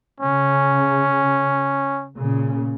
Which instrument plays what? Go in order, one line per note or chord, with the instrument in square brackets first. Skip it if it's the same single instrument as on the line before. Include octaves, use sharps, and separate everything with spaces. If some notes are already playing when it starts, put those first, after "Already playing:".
[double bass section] C#3 [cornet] C#4
[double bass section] A#2 C#3